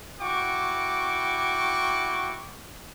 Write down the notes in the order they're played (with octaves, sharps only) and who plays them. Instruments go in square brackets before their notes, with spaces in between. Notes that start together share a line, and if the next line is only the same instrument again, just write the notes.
[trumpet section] E4 F#4 G5 C#6 D6